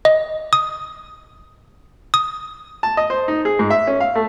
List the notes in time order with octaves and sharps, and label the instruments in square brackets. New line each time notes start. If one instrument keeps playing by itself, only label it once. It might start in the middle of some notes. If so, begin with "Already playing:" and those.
[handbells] D#5
D#6
D#6
[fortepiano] A5
D#5
C5
D#4
G#4
G#2
E5
C#4
F5
A3